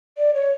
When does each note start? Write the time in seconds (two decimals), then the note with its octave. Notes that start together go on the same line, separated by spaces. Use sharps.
0.18 D5
0.34 C#5